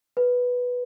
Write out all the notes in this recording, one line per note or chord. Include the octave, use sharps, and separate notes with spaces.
B4